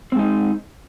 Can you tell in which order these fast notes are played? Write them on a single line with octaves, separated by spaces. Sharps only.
C4 G#3 D#4